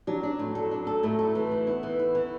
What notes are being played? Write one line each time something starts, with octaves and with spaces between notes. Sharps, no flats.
F#3 D4
D4
A2
A4
D4
A4
A2 A3
A4
E3
E4
B3 E4
E3
E4
E3